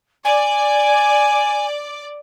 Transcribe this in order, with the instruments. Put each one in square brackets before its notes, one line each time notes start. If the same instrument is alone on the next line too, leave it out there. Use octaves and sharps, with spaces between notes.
[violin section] D5 [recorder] G#5